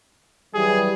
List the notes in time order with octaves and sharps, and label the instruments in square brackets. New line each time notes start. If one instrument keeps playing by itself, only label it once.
[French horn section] E3 F#3 G3 [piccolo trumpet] G#4